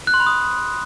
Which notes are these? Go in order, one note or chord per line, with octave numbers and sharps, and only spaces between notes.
F#6
C6
B5
D#6